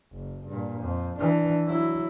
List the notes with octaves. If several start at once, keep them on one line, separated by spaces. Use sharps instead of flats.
F#1
G2 A#2
F2
E3 D4
F#3 E4